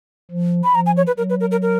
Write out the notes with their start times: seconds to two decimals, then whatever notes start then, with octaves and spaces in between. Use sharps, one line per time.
0.31 F3
0.64 B5
0.74 F3 A#5
0.86 G#5
0.97 C#5
1.07 B4
1.18 F#3 A#4
1.30 B4
1.40 A#4
1.51 A#4
1.62 A#4